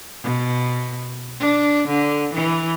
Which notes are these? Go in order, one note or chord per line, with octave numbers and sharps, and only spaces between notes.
B2
D4
D3
E3